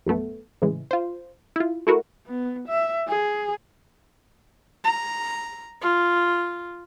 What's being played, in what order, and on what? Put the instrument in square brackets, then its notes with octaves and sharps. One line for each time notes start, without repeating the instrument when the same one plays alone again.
[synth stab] A#1 F#2 A3 B3
A2 C#3 E3 G#3
F4 C5
E4 F4
A3 E4 F#4 A#4
[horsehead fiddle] B3
E5
G#4
[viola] A#5
F4